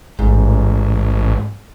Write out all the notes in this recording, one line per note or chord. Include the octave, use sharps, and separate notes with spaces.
A1 G#2